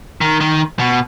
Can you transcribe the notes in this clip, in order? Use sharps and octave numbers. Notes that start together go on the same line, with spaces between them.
D#3
D#3
B2